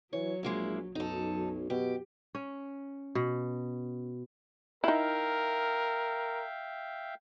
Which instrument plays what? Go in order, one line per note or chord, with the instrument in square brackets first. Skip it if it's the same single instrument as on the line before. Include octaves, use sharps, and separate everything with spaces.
[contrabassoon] E3 [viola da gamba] F#3 [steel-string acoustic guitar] C#5
[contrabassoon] A#1 [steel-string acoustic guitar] G#3 A#3 E4
[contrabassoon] B1 [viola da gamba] F#2 [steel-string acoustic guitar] D#4 A4
[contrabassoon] B2 [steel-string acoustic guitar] G4
[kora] C#4
B2
[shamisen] D#4 E4 [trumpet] A#4 [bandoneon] E5 F5 G5